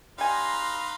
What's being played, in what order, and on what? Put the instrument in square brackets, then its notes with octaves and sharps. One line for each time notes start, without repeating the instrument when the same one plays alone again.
[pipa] G3 G#5 [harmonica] D#4 B4 F5 [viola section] A#5 C6